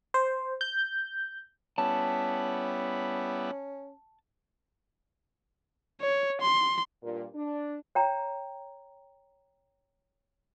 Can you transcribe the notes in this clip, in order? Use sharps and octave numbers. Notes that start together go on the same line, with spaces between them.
C5
G6
G3 B3 C#4 E4 A5
C#5
C6
G2 A#2
D4
C#5 G5 A#5